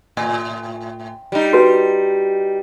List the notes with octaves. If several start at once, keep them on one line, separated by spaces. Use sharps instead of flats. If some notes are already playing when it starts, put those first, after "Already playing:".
A2
G3 D#4
F#4 B4